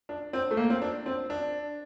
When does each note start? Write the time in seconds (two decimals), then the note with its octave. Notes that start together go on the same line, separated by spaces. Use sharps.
0.09 D4
0.33 C4
0.51 A3
0.57 A#3
0.70 C4
0.82 D4
1.06 C4
1.30 D4